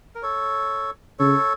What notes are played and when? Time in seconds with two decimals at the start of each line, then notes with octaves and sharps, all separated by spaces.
0.15 A#4
0.23 A4 C#5
1.19 C#3 A4 C#5